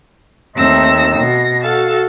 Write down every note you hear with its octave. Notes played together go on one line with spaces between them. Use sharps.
D#2 A3 C4 D#4 E6 A#6
B2 A#6
F#4 A4 F5 A5